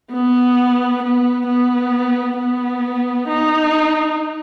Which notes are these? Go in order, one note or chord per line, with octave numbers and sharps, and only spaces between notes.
B3
B3
B3
B3
D#4